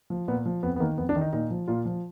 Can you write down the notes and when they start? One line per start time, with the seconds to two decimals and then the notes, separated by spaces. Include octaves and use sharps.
0.10 F3
0.28 A#2 B3
0.46 F3
0.63 F2 B3
0.76 B3
0.80 D#3 A#3
0.98 F2 B3
1.09 D4
1.16 D#3
1.21 D#4
1.33 A#2 D#4
1.50 F3
1.68 A#2 F4
1.85 F3